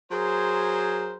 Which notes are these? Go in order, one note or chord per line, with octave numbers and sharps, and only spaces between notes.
F#3 G#4 A#4 C5